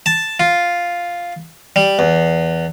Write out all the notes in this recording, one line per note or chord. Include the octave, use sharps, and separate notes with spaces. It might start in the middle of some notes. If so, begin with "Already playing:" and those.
A5
F4
G3
E2